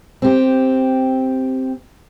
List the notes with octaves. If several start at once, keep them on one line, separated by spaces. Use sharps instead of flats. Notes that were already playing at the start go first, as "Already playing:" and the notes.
C4 G4